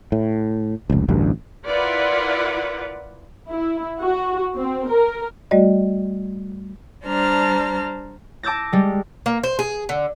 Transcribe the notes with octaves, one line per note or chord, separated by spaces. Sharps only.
A2
F1 C#2
A1 D2 G2
E4 F4 A#4 B4 D5 F#5
E4
F#4
C4
A#4
G3 A3 F#4 D5 D#5
G3 D4 C5 A5 A#5 F6
A5 D6 E6 G6 A6 A#6
G3 G#3
A#3
C5
G#4
D3